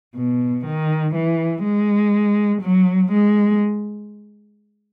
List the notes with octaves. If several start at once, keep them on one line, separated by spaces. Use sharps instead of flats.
B2
D#3
E3
G#3
F#3
G#3